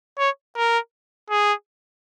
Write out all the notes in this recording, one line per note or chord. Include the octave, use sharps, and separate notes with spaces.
C#5
A#4
G#4